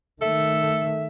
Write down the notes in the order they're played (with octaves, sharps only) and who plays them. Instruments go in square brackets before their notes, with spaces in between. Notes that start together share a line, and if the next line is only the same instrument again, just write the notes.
[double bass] D#3 A3 [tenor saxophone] A4 [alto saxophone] E5